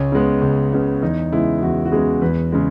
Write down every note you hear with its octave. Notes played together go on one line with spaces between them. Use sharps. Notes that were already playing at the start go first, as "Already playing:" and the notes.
Already playing: C#2 C#4
C#3 G#3 B3
C#2
C#3 G#3 B3
E2 D#4
C#3 G#3 B3 E4
E2 F#4
F#4
C#3 G#3 B3 G#4
E2 B4
C#3 G#3